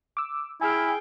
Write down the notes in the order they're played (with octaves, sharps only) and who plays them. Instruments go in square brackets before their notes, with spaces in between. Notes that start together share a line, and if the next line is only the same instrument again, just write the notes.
[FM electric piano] D6 E6
[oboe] E4 [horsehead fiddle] G#4 G5 [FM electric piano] G#5 E6 F6